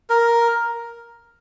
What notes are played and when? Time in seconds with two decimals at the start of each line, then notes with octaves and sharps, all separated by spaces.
0.10 A#4